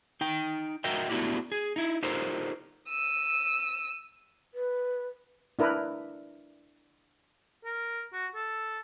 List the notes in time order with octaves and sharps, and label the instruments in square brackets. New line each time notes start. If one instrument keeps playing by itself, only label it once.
[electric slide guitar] D#4 G5
F#4 A#4 D#5 E5 G5
A3 B3 D4 E4 F#4 G4
G#4
D#4 E4
D#4 F4 G4 A4 A#4 C5
[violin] E6 D#7
[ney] B4
[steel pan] D4 E4 A#4 B4
[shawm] A#4
F#4
A4